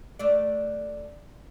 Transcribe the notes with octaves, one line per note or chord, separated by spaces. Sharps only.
A3 D4 D5